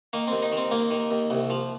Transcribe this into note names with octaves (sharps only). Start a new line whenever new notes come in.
D#3 A#3
D#2 C4
D#4
D#3 C4
D#2 A#3
D#3
D#2
C2
F3